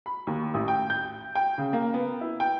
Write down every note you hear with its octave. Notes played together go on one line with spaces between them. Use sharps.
B5
D#2
A1
G5
G6
G5
C#3
A#3
B3
E4
G5